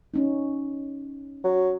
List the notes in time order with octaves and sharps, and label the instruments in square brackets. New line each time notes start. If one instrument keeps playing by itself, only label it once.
[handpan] C#4 D#4
[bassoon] F#3